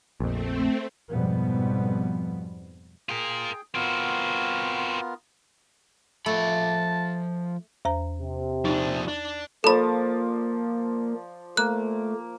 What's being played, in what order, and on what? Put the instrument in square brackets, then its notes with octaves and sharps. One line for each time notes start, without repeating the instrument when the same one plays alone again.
[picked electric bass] A#1 F2 [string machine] A3 C4
[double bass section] F2 G#2 B2 F3 G3 B3
[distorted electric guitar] F4 A#4 [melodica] G#4 G5
[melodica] B3 F4 A#4 [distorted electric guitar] C4 F#4
[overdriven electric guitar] F3 B5 [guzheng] A3 [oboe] A5
[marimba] E2 C5 A#5
[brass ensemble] C3
[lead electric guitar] F3 D4 [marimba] D#4
[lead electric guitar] D4
[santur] F3 D5 A5 [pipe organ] A#3 [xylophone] A4 B5
[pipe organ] A3 [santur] A#3 [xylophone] F#6